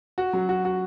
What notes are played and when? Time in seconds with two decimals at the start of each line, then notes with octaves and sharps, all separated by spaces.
0.18 F#4
0.33 F#3
0.49 F#4
0.65 F#4